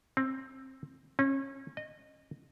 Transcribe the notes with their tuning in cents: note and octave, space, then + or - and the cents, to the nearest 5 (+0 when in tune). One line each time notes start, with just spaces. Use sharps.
C4 +15
C#4 -30
D#5 -20